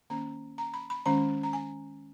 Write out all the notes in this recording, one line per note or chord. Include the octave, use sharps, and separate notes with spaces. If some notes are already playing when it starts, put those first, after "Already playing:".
D#3 A#3 C#4 A#5
A#5
B5
B5
D#3 G#3 C#4 A#5
A#5
G#5